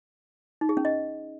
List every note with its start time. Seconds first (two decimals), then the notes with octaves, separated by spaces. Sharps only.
0.61 D#4
0.69 G#4
0.77 C#4
0.85 D#5